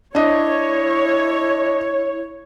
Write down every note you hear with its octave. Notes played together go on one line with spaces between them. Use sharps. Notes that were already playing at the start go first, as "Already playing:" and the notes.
D4 E4 C#5 D#5